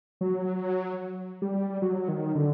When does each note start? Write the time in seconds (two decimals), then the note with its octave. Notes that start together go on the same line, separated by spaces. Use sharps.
0.21 F#3
1.42 G3
1.82 F#3
2.08 D#3
2.35 D3